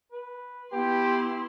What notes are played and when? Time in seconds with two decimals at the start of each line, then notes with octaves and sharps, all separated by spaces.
0.12 B4
0.73 B3 E4 G4 C6